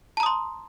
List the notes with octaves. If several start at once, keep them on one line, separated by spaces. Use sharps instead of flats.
A5 A#5 C6 D#6